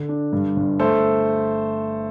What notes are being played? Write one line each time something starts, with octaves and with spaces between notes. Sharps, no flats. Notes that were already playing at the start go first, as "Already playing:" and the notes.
Already playing: D3
D4
G2
G1
A3 A4 C5